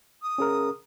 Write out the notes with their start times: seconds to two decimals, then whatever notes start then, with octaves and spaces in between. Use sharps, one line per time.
0.22 D#6
0.38 C#4 G#4 A#4